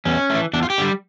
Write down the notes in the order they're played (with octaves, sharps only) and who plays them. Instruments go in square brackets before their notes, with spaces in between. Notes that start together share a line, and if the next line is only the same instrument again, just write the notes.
[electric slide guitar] E2 C#4
A3
E3
E2 D4
F4
G4
D3 G3